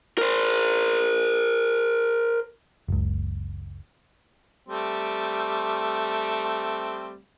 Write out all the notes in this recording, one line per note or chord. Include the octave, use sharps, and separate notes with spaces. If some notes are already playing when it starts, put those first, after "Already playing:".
A#4 C5
F#1 C#2
G3 A3 C4